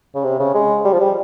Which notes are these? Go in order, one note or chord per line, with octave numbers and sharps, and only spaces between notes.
C#3
C3
C#3
G#3
G3
F3
G3